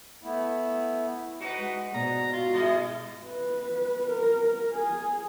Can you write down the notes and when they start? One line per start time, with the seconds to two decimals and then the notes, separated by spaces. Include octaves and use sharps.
0.23 A3 B3 E4
1.41 D#4 F#4 B4
1.58 G#3
1.94 G#2 B2 D5 A#5
2.33 F4 F#4
2.55 G3 E4 G#4 D#5
3.27 B4
4.09 A#4
4.74 G#4